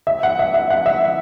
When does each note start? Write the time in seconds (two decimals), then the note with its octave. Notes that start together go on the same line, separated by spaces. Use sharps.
0.07 E5
0.23 F#5
0.39 E5
0.54 E5
0.70 F#5
0.86 E5